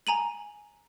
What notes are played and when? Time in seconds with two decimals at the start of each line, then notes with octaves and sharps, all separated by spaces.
0.07 G#5 A#5 D#7 F#7